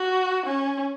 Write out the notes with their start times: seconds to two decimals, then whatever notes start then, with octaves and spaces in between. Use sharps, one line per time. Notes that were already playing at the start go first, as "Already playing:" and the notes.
Already playing: F#4
0.46 C#4